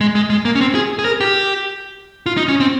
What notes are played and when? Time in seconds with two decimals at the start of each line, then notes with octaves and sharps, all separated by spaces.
0.01 G#3
0.15 G#3
0.30 G#3
0.45 A#3
0.55 C#4
0.61 C4
0.75 G#4
0.99 G#4
1.05 A#4
1.21 G4
2.26 F4
2.37 D#4
2.48 C#4
2.60 C4